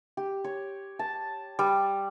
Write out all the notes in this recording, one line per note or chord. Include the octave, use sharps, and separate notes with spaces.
G4
C#5
A5
G3